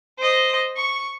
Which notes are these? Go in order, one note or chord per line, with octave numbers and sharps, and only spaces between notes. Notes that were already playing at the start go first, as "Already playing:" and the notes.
C5 D#5
C#6